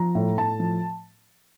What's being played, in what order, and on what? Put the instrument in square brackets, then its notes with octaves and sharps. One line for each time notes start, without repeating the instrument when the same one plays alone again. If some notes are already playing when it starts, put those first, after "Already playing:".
Already playing: [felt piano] F3 A#5
A2
A2 A5
F3